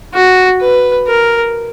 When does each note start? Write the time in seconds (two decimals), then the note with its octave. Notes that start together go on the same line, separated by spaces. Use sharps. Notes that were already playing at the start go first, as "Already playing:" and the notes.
0.14 F#4
0.61 B4
1.07 A#4